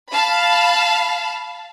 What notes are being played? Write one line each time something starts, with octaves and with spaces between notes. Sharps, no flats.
F5 A5 B5